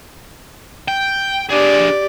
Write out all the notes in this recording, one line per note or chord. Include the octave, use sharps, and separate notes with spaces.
G5
D4 G4 G#4 D5